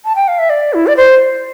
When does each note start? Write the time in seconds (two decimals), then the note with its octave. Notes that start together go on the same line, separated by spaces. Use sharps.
0.05 A5
0.15 G5
0.28 F5
0.39 E5
0.50 D5
0.74 E4
0.87 D5
0.97 C5